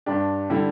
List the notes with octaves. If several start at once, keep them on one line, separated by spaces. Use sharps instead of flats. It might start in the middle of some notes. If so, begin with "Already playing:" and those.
G2 G3 D4 G4
D3 G3 E4 G4